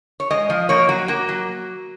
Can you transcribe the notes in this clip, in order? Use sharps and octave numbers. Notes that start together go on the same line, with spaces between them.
C#5
G#3 D#5
F3
A#3 C#5
F#3 F#4
A#3 F#4
F#3